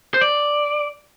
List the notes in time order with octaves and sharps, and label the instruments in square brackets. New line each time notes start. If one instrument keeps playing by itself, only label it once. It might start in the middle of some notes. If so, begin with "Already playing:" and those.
[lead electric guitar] C5
D5